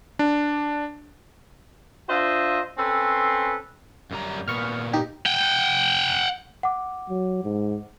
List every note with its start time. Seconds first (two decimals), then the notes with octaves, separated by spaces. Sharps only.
0.19 D4
2.09 D4 F4 C5 D#5 E5
2.78 C4 C#4 A4 B4 C6
4.11 F#2 G3 A#5
4.48 A#2 B3 C#6 F6
4.93 D#4 G4
5.26 F#5 G5
6.63 F#5 D6
7.09 F#3
7.44 G#2